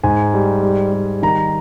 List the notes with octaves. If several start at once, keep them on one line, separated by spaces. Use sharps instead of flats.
G#2 G#5
G3
G3
G3
D#3 A#5